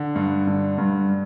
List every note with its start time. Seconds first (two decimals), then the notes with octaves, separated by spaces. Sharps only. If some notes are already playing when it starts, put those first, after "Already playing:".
Already playing: D3
0.16 G2
0.47 D3
0.78 G2